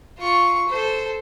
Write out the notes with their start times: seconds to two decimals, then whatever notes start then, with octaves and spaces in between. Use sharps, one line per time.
0.18 F4 C#6
0.68 A4 C5